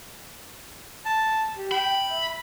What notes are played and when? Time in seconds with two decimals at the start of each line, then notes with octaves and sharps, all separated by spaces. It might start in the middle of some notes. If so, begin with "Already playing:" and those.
1.05 A5
1.57 G4
1.72 G5 B5
2.10 E5